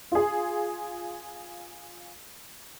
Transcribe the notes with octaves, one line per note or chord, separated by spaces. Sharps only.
F4 G#4